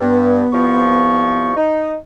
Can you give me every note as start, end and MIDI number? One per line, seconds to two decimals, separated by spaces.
0.01 0.43 43
0.01 1.51 59
0.53 1.53 36
0.53 1.53 53
0.53 1.53 85
1.57 1.94 63